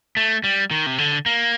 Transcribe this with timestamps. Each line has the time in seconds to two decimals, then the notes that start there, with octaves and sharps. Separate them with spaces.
0.17 A3
0.44 G3
0.71 D#3
0.86 C3
0.98 D3
1.26 A#3